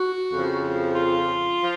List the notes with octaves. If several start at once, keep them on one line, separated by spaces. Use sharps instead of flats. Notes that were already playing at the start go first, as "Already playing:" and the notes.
Already playing: F#4
F2 C#3 F3
F4
F3